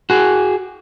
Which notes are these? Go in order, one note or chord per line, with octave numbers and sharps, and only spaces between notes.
F#4 G#4